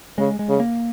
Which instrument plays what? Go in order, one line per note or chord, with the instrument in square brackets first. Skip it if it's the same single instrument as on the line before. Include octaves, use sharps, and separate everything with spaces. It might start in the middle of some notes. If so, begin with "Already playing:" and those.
[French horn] C#3 [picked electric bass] G#3
[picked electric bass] G#3
[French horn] C#3
[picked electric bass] A#3